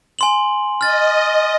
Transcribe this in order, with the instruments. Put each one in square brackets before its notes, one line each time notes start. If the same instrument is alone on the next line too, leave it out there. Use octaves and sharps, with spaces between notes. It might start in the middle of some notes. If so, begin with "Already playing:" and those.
[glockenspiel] G#5 C6 F#7
[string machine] D#5 [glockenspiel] F6 A6